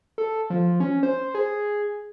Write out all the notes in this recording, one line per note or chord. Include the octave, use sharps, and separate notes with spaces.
A4
F3
C#4
C5
G#4